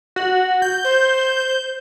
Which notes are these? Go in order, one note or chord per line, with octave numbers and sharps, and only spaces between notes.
F#4
G6
C5